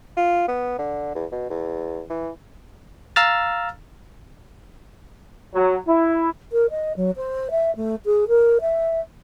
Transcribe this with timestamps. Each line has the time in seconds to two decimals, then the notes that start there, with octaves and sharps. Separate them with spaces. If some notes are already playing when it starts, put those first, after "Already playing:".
0.17 F4
0.48 B3
0.78 D3
1.15 E2
1.32 B2
1.50 E2
2.10 E3
3.16 F5 A#5 E6 F6 A6
5.54 F#3
5.87 E4
6.52 A#4
6.70 D#5
6.97 F#3
7.17 C5
7.51 E5
7.76 A3
8.05 G#4
8.28 A#4
8.61 E5